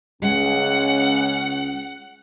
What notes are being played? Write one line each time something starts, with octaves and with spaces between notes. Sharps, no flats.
C#2 G#3 C#4 F#5